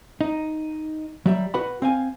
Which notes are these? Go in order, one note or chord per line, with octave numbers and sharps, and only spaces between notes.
D#4
F#3 G3 E5
F#4 B4 F#5 B5
C4 F5 G#5